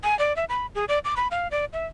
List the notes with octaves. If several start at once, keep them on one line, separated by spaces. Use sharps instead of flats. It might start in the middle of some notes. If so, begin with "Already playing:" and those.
G#5
D5
E5
B5
G#4
D5
D6
B5
F5
D5
E5